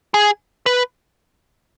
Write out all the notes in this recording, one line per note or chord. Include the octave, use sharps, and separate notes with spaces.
G#4
B4